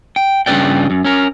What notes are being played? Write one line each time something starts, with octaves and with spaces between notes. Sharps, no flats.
G5
G2 C#3 G#3 B4 D5 G5
F#2
C#4 A#4